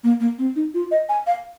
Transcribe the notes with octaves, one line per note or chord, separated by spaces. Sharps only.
A#3
A#3
C4
D#4
F4
D#5
G#5
F5